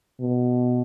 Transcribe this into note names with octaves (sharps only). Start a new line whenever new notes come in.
B2